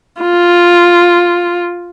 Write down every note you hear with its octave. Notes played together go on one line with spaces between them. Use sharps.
F4